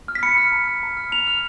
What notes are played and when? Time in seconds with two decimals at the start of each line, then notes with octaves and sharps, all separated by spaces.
0.08 F6
0.15 B6
0.23 B5 C#7
0.37 F6
0.52 A#5
0.68 F6
0.83 A#5
0.97 F6
1.12 A#5 F7
1.27 F6 F7